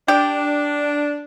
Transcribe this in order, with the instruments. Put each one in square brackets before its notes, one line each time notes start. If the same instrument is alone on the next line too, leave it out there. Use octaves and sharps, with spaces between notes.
[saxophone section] D4 [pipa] G4